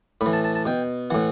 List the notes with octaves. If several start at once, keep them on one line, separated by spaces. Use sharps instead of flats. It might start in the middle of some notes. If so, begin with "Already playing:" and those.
A2 B5
E3
A5
A5
A5
B2 G5
A2 E3 F#5